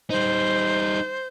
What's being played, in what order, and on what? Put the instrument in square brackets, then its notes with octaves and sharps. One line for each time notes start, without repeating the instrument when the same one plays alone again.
[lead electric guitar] G3 D#4 [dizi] C5